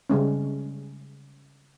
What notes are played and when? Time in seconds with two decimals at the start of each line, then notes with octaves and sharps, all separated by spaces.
0.10 C#3 G3 G#3 C#4